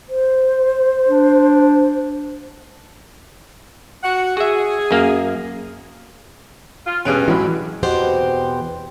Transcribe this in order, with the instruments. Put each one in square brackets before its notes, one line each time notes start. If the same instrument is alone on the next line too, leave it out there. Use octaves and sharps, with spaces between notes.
[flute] C5
[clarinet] D4
[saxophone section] F#4 F#5
[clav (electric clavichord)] F#4 E5 [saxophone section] G#4
[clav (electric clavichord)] F#2 A#3 F5
[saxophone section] F4
[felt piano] E1 F#6 D7 [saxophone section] G2 [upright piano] C#4 G#4
[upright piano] A2 G#3 [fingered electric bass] E3 [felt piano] F#3 E4
[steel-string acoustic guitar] E2 B2 C4 G4 C5 F#5